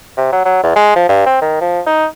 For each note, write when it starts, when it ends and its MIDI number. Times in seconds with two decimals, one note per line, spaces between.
0.17 0.29 48
0.32 0.41 54
0.45 0.59 54
0.63 0.73 40
0.76 0.95 56
0.96 1.04 53
1.09 1.25 43
1.26 1.37 60
1.41 1.57 51
1.61 1.80 53
1.86 2.06 63